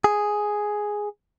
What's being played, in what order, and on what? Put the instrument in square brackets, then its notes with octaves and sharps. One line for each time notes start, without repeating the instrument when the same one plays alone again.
[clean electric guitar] G#4